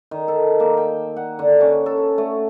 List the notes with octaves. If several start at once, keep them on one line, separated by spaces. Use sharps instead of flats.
D#3
A4
A#3
G5
F#5
D3
C#4
A4
A3